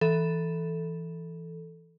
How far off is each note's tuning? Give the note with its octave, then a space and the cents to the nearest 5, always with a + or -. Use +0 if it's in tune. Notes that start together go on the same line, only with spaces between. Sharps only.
E3 +0 A4 +0